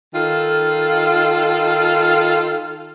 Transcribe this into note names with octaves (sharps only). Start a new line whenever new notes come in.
D#3 F4 A4